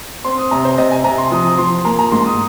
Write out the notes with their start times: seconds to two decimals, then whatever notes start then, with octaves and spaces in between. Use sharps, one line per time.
0.25 C4 C6
0.38 D#6
0.51 C3 A#5
0.65 C5
0.78 C3 D#5
0.91 G#5
1.04 C3 A#5
1.18 C6
1.31 F3 D#6
1.58 F3 C6
1.85 A#3 A#5
1.99 A#5
2.12 G#2 C6
2.26 D#6